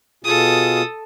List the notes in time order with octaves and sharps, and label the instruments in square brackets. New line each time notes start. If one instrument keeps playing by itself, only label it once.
[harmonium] B2 F4 G#4 [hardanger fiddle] A4 D#6